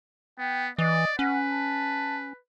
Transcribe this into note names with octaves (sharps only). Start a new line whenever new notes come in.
B3 G5
E3 D5 D#5
C#4 B4 F#5
A5